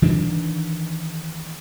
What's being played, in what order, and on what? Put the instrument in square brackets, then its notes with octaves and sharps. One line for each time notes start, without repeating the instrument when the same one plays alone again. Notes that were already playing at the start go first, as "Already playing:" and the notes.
[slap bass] D#3 E3 D4